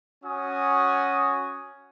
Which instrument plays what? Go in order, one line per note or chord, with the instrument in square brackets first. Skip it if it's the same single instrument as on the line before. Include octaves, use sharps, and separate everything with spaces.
[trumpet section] C#4 F#4 G#5 D#6